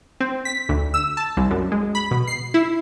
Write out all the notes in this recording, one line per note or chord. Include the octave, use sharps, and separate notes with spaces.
C4
B6
D2
E6
A5
C2
F#2
G#3
B5
B2
C7
E4